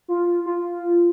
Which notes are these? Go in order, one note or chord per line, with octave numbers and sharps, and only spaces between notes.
F4
F4